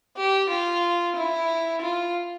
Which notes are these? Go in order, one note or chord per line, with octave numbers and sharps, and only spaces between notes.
G4
F4
E4
F4